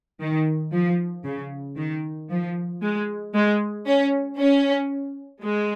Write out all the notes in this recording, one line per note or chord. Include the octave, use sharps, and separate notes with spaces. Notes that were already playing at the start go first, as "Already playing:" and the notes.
D#3
F3
C#3
D#3
F3
G#3
G#3
C#4
C#4
G#3